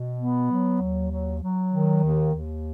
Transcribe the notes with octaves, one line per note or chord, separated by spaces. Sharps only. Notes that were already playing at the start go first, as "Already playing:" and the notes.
Already playing: B2
B3
F#3
D#2
F#3
F#3
D#3
D#2
D#2